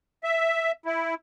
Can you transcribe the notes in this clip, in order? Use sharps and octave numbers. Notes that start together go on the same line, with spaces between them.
E5
E4